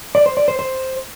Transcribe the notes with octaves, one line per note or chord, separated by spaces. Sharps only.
D5
C5
D5
C5
C5